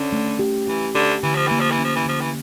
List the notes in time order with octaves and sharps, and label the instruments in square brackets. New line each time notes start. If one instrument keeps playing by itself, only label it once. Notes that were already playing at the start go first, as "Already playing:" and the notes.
Already playing: [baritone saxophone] D3 [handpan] C#4
[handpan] A3
G4
[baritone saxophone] E3 [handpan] G4
[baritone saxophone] D3 [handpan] G4
[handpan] D3 [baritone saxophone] E3
[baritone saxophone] F3
[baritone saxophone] E3 [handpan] A#3
[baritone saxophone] F3
E3
[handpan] C#4
[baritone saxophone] F3
E3
[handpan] D3 [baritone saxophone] F3
[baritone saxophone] E3